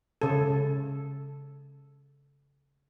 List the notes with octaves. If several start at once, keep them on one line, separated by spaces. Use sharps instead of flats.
C#3 A4